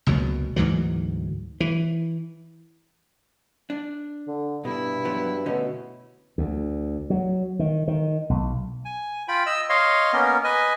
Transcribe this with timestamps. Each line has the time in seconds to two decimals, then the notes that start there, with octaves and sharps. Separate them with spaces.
0.07 F#1 C#2 B2 F#3
0.56 D2 G#2 E3 F#3
1.60 E3
3.70 D4
4.27 D3
4.65 G2 B2 E4
5.05 F3 F#3 B3
5.46 B2 D3 A3 C#4
6.38 D2
7.10 F#3
7.59 D#3
7.88 D#3
8.30 B1
8.85 G#5
9.28 F4 G5 B5
9.46 D#5 E6
9.69 C#5 D#5 F5 C6
10.13 A#3 B3 C#4 A#4
10.44 B4 D#5 G#5